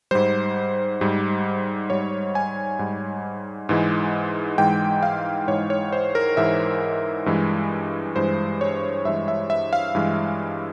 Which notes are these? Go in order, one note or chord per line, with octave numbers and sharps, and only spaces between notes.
G#2 G3 C5
G#2 G3
G#2 G3 C#5
G#5
G#2 G3
G#2 E3 G#3
G#2 E3 G#3 G5
F5
G#2 E3 G#3 C#5
C#5
C5
A#4
G#2 E3 G#3 E5
G2 E3 G#3
G2 E3 G#3 C5
C#5
G2 E3 G#3 E5
E5
E5
F5
G2 E3 G#3